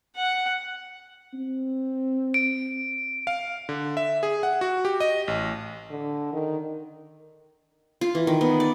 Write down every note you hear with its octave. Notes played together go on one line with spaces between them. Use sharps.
F#5
C4
D7
F5
D3
E5
G#4
F#5
F#4
G4
D#5
A1
D3
D#3
F4
E3
D#3
B3
D5